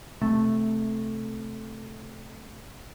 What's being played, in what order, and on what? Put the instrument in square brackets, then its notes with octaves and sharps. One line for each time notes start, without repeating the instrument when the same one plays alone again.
[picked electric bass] C3 A3